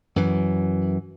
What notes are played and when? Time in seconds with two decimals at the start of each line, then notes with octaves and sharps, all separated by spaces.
0.16 F#2 E3